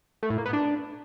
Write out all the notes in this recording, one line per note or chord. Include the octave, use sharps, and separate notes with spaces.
A3
A2
A#3
B3
D4